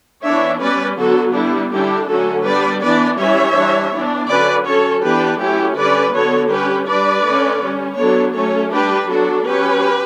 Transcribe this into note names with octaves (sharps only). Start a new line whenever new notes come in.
E3 B3 D4 C#5 E5
G3 C#4 B4 D5
D3 F#3 B3 F#4 A4
G3 B3 D4 E4
D3 G3 D4 E4 G4
D3 F#3 A3 C#4 F#4 A4
G3 B3 D4 B4 D5
E3 B3 D4 B4 D5
E3 G3 C#4 C#5 E5
E3 G3 D4
E3 B3 D4
D3 F#3 C#4 B4 D5
F#3 C#4 A4 C#5
E3 B3 D4 G4 B4
F#3 A3 C#4 E4 G4
D3 G3 C#4 B4 D5
D3 F#3 B3 A4 C#5
G3 C#4 G4 B4
G3 D4 B4 D5
D3 A3 C#4
G3 C#4
F#3 B3 D4 A4 C#5
F#3 A3 C#4 A4 C#5
G3 D4 G4 B4
F#3 B3 D4 F#4 A4
F#3 C#4 G4 B4